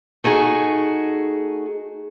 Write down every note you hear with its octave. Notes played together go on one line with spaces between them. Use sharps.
A3 D#4 F#4 G#4